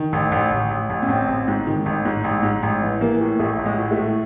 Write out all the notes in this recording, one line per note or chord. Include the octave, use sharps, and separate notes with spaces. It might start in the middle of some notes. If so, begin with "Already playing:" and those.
Already playing: D#3
A1
A1
A1
A1
A1
C#4
A1 C4
A1
G#2
D#3
A1
G#2
A1
G#2
A1
E3
E3 A#3
A2
A1 A3
A1
G#3
A2
A3
A2